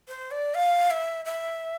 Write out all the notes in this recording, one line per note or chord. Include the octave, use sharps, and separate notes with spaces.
C5
D5
F5
E5
E5